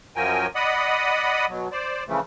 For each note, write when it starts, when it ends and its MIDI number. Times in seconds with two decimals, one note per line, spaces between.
0.16 0.47 42
0.16 0.47 53
0.16 0.47 54
0.16 0.47 70
0.16 0.47 79
0.16 0.47 80
0.55 1.46 74
0.55 1.46 75
0.55 1.46 78
0.55 1.46 83
0.55 1.46 87
1.50 1.68 47
1.50 1.68 54
1.72 2.04 72
1.72 2.04 74
2.08 2.20 49
2.08 2.20 52
2.08 2.20 53
2.08 2.20 57